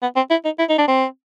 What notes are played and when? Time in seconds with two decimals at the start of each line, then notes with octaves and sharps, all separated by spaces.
0.02 B3
0.16 C4
0.31 E4
0.45 D#4
0.59 E4
0.69 D#4
0.78 D4
0.88 C4